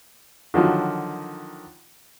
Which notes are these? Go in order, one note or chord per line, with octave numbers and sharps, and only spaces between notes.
D3 D#3 F3 F#3